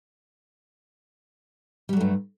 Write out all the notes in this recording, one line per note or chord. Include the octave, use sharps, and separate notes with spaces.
G2 F#3 G3 A3